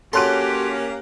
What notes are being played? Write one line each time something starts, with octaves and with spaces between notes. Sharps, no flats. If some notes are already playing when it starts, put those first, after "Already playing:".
F#3 A#3 C#4 G4 A4 C6 F#6 D7